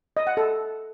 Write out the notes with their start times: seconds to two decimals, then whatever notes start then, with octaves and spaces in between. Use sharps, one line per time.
0.17 D#5
0.27 F#5
0.37 A4